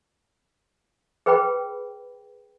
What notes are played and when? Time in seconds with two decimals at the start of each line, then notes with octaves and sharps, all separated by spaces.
1.26 G#4 B4 C5 G5 B5